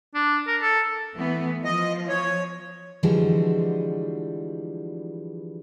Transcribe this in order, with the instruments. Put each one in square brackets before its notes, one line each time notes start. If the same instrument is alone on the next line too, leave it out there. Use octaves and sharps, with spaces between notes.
[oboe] D4
A#4
A4
[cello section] E3 A3 B3
[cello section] F3 [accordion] D#5
[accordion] C#5
[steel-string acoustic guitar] D3 E3 F3 G3 G#3 F#4